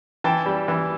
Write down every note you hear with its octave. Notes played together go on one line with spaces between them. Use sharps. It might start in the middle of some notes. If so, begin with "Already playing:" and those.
E3 G5 A5
G3
E3